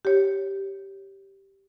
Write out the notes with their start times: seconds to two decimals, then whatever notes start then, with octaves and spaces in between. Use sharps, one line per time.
0.05 G4 C#5